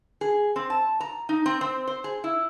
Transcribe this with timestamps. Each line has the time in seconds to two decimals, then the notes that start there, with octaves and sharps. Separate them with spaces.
0.21 G#4
0.56 C4
0.70 A5
1.00 A#5
1.29 D#4
1.46 C4
1.61 C4
1.87 C5
2.04 G#4
2.24 E4